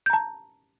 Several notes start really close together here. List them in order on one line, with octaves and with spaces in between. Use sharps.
G6 A#5 A5